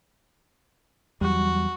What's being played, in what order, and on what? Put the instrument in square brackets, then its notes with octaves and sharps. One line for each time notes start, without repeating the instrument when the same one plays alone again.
[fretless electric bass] E2 F#3 [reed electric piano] G3 [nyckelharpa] F#4